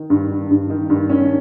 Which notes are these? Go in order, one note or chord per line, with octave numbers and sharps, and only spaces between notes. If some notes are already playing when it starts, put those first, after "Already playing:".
Already playing: D#3
G2
D#3
G2
D#3
G2
D#3 C#4